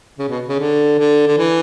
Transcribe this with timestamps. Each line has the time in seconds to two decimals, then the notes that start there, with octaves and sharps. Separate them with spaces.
0.19 C#3
0.29 B2
0.49 C#3
0.59 D3
0.99 D3
1.27 D3
1.38 E3